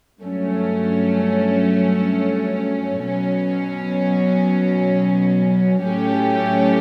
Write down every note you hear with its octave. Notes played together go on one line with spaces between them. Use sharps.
G2 F#3 A3 C#4
B2 F#3 C#4
A2 F#3 A3 C#4 G4